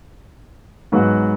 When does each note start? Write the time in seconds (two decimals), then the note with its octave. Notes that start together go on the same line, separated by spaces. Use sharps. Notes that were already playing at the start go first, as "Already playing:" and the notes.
0.92 G#2 F#3 B3 F#4